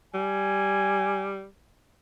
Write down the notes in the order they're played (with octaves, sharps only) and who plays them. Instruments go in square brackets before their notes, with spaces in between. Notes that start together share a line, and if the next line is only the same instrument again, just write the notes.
[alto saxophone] G3 [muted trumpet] G#5